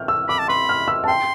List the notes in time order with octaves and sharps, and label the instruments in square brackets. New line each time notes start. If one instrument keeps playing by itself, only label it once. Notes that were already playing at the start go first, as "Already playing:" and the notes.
Already playing: [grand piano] F6 G6
E6
[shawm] B5 [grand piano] D6
[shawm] A5
[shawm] B5 [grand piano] C6
[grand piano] F6
E6
A5
[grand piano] G5 [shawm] C6